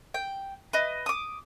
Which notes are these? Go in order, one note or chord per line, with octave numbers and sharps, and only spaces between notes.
G5
B4 D#5
D6 D#6